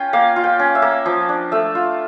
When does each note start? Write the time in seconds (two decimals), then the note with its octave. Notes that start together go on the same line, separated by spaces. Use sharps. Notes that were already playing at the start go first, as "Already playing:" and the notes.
Already playing: C#4 F4 G5
0.13 A#3 F5
0.36 F4
0.44 G5
0.59 C#4
0.75 E5
0.82 A#3
1.06 F3
1.29 D4
1.52 A3 E5
1.75 F4